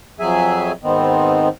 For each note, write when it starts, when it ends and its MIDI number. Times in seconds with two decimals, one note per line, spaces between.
0.20 0.72 41
0.20 0.72 54
0.20 0.72 68
0.20 0.72 76
0.20 0.72 80
0.84 1.48 44
0.84 1.48 51
0.84 1.48 59
0.84 1.48 60
0.84 1.48 63